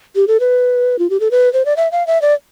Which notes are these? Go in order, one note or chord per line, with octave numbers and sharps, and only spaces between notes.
G4
A4
B4
F4
G4
A4
B4
C5
D5
E5
F5
E5
D5